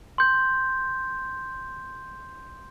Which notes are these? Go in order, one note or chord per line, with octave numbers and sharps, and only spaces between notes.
C6 G6